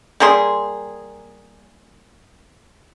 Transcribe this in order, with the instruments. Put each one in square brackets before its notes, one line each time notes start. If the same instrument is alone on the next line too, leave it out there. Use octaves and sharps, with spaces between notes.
[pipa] G3 A#3 G#4 C6